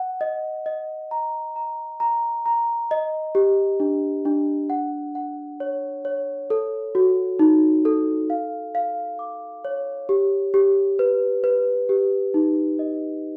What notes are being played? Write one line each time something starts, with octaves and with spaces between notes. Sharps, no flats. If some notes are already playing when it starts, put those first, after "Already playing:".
Already playing: F#5
D#5
D#5
A#5
A#5
A#5
A#5
D#5
G4
D4
D4
F#5
F#5
C#5
C#5
A4
F#4
D#4
A4
F5
F5
D6
C#5
G4
G4
B4
B4
G4
D#4
D#5